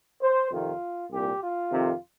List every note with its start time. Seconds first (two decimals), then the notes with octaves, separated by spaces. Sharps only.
0.22 C5
0.52 F2 C3 D#3 F4
1.11 C2 A#2 G4
1.41 F4
1.71 F2 C3 D#3